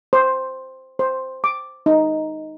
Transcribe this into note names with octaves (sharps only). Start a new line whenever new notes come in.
C5
C5
D6
D#4